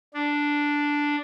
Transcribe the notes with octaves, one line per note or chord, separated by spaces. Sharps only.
D4